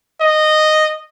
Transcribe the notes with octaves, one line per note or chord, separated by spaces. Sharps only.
D#5